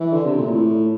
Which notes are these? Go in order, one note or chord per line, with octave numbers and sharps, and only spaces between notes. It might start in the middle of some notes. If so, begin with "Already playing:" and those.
E3
D3
C3
A#2
A2